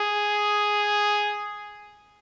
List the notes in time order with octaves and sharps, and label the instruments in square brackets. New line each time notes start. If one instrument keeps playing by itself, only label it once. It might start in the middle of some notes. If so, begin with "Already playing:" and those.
Already playing: [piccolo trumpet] G#4